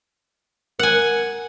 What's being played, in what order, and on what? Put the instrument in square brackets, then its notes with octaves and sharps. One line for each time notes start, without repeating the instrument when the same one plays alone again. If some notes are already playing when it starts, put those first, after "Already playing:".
[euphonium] A#4 [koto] F#5 G#5